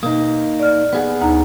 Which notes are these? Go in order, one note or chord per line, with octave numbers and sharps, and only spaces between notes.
B2 A#3 D#4
D5 F6
B3 G#4 F#5
D2 D#4 A#5